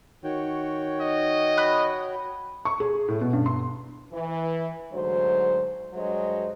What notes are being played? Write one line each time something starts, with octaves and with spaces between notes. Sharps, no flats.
D#3 F#4 C#5 G5
D#5
B5 F#6
C#6
G#4
A2
B2
G2
C6
E3
D2 G#2 F#3 C5
G2 F#3 G#3 C5 D#5